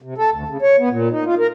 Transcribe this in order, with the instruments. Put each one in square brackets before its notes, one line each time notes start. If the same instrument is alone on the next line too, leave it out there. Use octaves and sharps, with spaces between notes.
[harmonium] C3
A4
D2
C#3
C#5
B3
A#2
D#4
F4
A#4